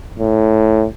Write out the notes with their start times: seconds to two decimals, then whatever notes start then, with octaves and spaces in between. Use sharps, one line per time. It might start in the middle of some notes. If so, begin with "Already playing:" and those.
0.19 A2